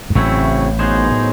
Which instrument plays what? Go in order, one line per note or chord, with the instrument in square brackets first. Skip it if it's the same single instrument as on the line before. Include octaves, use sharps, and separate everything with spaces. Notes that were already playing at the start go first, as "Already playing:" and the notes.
[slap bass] G#2
[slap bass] A1 A2 [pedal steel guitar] C#3 F#3 A3 C4 E4
[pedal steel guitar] F#3 B3 D#4 G#4 C5
[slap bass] A2